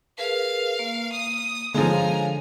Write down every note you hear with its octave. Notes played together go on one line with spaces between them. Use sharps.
G#4 A#4 B4 F5
A#3
D#6
D3 F3 G#3 C#5 F5 G#5 A#5